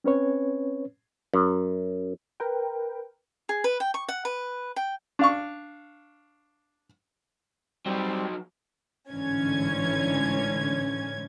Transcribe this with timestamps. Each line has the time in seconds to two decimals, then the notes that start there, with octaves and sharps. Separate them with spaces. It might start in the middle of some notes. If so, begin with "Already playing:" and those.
0.04 C4 C#4 B4 C#5
1.34 F#2
2.40 A#4 B4 G5
3.49 G#4
3.64 B4
3.80 G5
3.94 C#6
4.09 F#5
4.25 B4
4.76 G5
5.19 D4 F5 C#6
7.86 F#3 G3 C4 D#4
9.11 A1 G#2 D3 E3 C#4 G#6